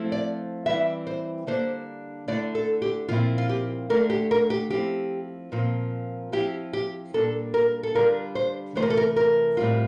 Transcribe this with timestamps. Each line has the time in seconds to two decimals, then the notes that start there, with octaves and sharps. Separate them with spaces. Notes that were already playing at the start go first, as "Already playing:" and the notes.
Already playing: F3 A3 C4 E4
0.12 D5
0.66 E3 G3 C4 E4 E5
1.07 C5
1.47 D3 G3 A#3 D4 C5
2.28 D3 A3 E4 D5
2.55 A4
2.82 G4
3.08 A#2 F3 C4 E4 F4
3.38 F4
3.49 G4
3.90 D3 A3 D4 A#4
4.10 G4
4.31 A#4
4.50 G4
4.70 F3 C4 E4 G4
5.52 A#2 F3 C4 F4
6.32 F3 C4 E4 G4
6.73 G4
7.14 A#2 G3 A#3 D4 A4
7.54 A#4
7.83 A4
7.95 D3 G3 D4 F4 A#4
8.35 C5
8.75 C3 E3 A3 C5
8.82 A#4
8.90 A4
8.97 A#4
9.16 A#4
9.57 A2 G3 C4 F4